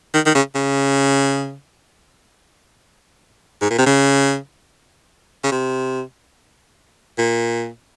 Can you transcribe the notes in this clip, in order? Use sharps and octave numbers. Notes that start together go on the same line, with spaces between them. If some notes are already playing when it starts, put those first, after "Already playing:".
D#3
D#3
C#3
C#3
G#2
A#2
C3
C#3
C#3
C3
A#2